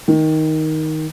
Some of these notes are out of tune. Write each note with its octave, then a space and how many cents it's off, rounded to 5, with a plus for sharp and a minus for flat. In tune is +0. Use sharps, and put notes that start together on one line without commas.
D#3 +10